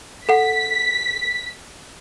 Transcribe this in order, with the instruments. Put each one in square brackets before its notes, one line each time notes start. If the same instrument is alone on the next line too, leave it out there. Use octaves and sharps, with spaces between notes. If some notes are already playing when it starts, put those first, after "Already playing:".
[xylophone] A4 F#5 [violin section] B6